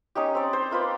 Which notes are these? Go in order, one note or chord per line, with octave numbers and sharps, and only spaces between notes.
C#4 D#4 G4
C4 D5
C5
A#3 F4 B4 C5